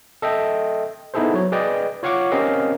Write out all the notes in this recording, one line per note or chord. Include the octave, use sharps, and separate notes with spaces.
A4 D#5 E5 G5
B3 D#4 E4 G#4 A4 C5
F#3 C#5
G#4 B4 D5 D#5 G5
F4 C#5 F5 F#5 C#6 D6
C4 C#4 G4 A#4 D#5 F5